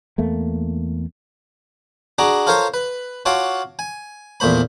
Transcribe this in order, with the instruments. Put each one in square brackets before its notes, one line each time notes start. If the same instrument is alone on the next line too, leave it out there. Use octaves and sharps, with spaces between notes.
[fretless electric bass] E2 A3 A#3
[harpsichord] D4 F#4 G#4 A#5 D6
F4 A4 A#4 C5 C#5 C6
B4
F4 F#4 C#5 A5 C6 D6
G#5
E2 A#2 A3 C5 B5